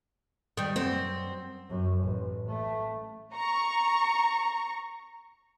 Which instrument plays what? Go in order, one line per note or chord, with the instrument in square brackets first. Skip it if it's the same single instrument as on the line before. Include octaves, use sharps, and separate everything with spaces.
[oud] D#3 G3
[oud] F#2 [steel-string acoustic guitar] C4
[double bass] F#2
A1
A3
[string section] A#5 C#6